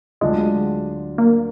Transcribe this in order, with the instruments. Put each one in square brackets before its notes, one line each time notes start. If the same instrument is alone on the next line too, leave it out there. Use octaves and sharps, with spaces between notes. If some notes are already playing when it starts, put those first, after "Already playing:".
[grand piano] D2 D3 F#3 D4 F4 [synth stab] G#3
[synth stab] A#3